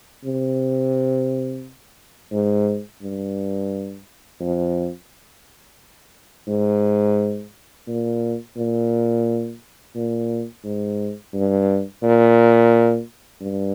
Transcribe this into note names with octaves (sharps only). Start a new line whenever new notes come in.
C3
G#2
G2
F2
G#2
A#2
A#2
A#2
G#2
G2
A#2
G2